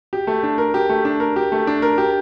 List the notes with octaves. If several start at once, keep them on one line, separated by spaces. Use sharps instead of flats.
G4
A3
D4
A#4
G4
A3
D4
A#4
G4
A3
D4
A#4
G4